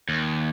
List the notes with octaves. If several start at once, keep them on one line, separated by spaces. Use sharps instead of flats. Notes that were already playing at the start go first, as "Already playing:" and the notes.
D#2